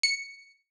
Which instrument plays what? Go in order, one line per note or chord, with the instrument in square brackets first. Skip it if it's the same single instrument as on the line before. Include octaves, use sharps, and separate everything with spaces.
[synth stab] C#7